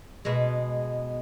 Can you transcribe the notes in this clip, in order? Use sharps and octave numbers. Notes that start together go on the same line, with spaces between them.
B2 G#3